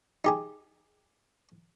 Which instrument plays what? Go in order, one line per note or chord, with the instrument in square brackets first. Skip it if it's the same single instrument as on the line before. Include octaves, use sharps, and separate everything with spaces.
[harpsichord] D#4 G4 G#4